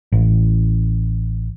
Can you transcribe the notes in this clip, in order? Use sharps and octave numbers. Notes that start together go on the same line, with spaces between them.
A1